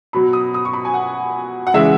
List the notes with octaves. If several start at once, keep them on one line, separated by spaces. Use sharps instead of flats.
B2 F#3 B5
D#6
D#6
C#6
B5
G#5
F#5
F#5
C#3 E3 G#3 E5